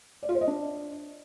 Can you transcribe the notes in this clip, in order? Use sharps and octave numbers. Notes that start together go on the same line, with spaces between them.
D5
F4
C5
D#5
D4